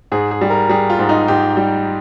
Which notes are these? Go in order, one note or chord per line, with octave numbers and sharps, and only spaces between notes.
G#2 G#4
G#4
G3
A#4
G3 G#4
F4
G#2
D#4
G#2 G4
G3